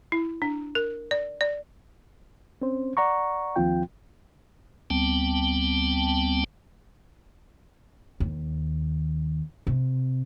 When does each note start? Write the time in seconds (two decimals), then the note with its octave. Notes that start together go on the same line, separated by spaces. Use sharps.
0.12 E4
0.42 D4
0.75 A#4
1.11 D5
1.41 D5
2.62 C4 C#4 C5
2.97 D5 F#5 A#5 C#6
3.56 D#2 F3 C4 F4 G5
4.90 D2 G3 B3 C4 G5 A5
8.20 D#2
9.67 C3